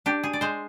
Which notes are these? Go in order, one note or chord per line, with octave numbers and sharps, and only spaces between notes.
D4 G4
G#4
D5
G#3 C5